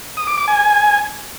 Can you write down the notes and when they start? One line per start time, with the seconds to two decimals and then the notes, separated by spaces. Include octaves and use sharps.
0.17 D#6
0.27 D6
0.37 D6
0.48 G#5